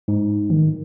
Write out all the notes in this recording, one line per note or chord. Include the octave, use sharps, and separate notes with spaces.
G#2
D#3